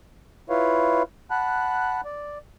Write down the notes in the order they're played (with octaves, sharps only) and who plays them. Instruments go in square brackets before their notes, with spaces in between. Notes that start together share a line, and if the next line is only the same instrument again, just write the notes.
[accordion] E4 F4 B4 C#5 F5
F#5 A5 B5 F#6
D5